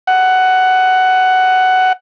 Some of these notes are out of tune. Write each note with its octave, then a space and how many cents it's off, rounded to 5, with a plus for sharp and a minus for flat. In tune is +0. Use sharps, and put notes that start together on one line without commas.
F#5 +10